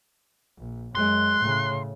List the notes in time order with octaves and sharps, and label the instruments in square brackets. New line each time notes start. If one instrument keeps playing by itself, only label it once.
[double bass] A#1
[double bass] F#2 G#3 [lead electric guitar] C6 [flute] F#6
[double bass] A2 C#3